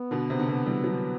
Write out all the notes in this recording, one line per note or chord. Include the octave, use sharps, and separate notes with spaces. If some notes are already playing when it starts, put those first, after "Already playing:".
Already playing: B3
B2 D3
C3
D3
C3
E3 G3
D3 F#3